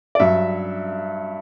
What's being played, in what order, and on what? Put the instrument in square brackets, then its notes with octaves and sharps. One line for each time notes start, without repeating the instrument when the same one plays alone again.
[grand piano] D5
G2 F#3 E5